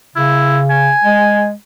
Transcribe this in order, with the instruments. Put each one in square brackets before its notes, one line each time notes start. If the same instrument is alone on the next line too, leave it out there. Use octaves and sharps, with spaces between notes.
[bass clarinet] C#3 [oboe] E4
[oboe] G#5
[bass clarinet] G#3